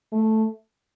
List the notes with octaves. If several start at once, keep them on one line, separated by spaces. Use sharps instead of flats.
A3